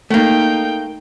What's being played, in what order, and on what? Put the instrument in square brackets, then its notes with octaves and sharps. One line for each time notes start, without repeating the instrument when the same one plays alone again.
[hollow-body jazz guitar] A3 A#3 [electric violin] D#4 G5